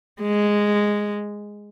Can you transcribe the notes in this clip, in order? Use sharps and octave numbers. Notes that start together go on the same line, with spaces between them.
G#3